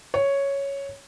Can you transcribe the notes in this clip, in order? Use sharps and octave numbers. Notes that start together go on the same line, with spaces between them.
C#5